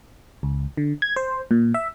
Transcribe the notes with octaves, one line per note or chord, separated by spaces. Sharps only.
C#2
D3
G#6
C5
A#2
E5